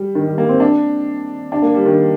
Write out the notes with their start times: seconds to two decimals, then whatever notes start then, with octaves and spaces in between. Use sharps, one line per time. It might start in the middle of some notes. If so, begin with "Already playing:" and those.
Already playing: G3
0.15 D#3
0.27 G3
0.38 A#3
0.49 C4
0.60 D4
1.52 D4
1.62 A#3
1.74 G3
1.86 D#3